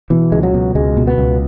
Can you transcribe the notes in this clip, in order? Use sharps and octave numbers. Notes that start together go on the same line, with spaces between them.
B2 E3
C#2 G#3
F#3
B2
C#2 G#3
B2
B3
C#2